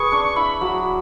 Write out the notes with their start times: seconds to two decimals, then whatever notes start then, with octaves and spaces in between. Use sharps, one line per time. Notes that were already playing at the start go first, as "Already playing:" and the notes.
Already playing: G#4 B4 C#6
0.12 D4
0.36 E4 B5
0.61 F#3